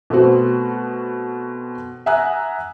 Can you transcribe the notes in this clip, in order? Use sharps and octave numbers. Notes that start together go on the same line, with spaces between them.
B2 A3 B3 C4 F#4
E5 F#5 G#5 A#5 D#6 F#6